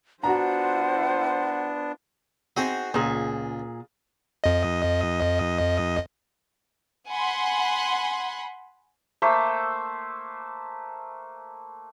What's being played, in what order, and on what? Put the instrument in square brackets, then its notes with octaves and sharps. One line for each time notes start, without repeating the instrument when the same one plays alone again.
[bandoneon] B3 D4 [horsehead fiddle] F4 C5 [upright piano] F#4 A#5 [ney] F#5
[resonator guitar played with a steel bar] C4 F#4 [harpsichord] D#4 G#4
[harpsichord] C#2 [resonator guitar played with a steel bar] A#2 G#4
[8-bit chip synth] F2 D#5
[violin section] F#5 G#5 B5 C6
[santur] A3 A#3 C5 E5